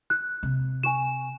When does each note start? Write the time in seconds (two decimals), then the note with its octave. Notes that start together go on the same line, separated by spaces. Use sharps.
0.10 F#6
0.43 C3
0.83 G#5 C#6 E7